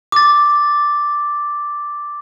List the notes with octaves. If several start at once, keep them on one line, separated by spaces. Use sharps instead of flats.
D6 A6